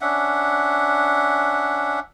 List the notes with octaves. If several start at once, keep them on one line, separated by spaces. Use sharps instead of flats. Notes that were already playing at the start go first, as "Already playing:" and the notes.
C#4 D4 E5 F#5